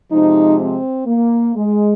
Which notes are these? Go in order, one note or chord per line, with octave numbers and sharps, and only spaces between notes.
C3 F3 G#3 D#4
C4
A#3
G#3